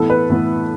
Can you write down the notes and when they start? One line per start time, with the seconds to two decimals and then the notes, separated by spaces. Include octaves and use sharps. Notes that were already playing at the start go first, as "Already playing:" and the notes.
Already playing: A2 E3 B3 A4
0.10 B4
0.30 A2 E3 B3